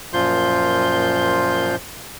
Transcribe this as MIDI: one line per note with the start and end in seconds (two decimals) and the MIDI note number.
0.13 1.76 42
0.13 1.76 46
0.13 1.76 53
0.13 1.76 65
0.13 1.76 84
0.13 1.76 91